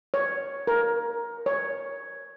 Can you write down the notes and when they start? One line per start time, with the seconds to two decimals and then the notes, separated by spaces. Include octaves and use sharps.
0.14 C#5
0.67 A#4
1.46 C#5